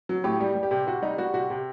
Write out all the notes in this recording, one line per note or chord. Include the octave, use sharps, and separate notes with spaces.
F#3
A2 G4
G3 G4
G3
G4
C3
C3 F#4
G3 D#4
G3 F#4
C3 F#4
C3